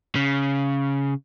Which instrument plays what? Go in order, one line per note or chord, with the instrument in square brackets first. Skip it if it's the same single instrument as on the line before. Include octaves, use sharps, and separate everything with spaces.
[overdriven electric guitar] C#3